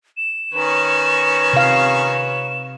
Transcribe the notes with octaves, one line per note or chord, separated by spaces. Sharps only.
E7
D#3 C#4 B4 C#5
C3 F5